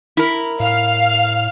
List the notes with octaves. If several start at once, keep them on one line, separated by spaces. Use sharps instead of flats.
E4 A#4
A2 F5 F6